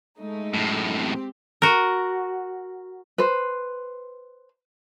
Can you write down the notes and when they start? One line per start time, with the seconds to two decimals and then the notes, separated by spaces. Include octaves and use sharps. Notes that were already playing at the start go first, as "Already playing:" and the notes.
0.19 G#3 A3 D#4
0.54 F#2 A2
1.00 C4 G4
1.62 F#4 A#4
3.18 B4 C5